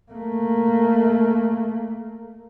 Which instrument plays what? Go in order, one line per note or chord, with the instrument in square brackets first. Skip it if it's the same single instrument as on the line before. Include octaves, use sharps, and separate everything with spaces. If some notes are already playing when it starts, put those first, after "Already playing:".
[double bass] A3 A#3